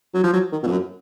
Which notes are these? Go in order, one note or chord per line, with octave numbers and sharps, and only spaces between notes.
F#3
F3
F#3
D#3
B2
F2
F#2